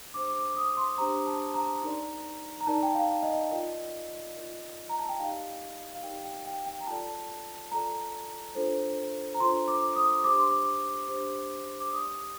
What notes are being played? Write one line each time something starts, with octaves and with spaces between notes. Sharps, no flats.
D4 G4 C5 D6
D6
D#6
C6
D4 G4 C5 A#5
A5
A#5
D#4 A#4 D5
A#5
D#4 A#4 D5 A5
G5
F5
D#5
F4 A#4 D5
F4 A#4 D5
A#5
A5
G5
D#4 G4 A#4 D5 F5
F5
D#4 G4 A#4 D5 G5
G5
G5
G5
A#5
F4 A4 D5 A5
F4 A4 D5 A#5
D4 F4 A4 C5
A#5
D4 F4 A4 C5 C6
D6
D#6
D4 G4 C5 D6
C6
D6
D4 G4 C5
D6
G4 D5 D#6